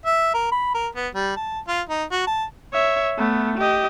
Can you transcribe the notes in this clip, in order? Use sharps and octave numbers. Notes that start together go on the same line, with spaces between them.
E5
A#4
B5
A#4
B3
G3
A5
F4
D#4
F#4
A5
C#5 E5
A3 B3
G4 D#5